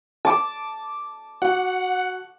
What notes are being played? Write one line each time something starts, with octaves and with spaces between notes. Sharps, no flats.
A5 D6
F#4 F#5